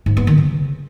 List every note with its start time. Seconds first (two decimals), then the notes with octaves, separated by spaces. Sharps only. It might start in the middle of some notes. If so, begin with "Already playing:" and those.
0.06 G#2
0.17 B3
0.27 D#3
0.38 C#3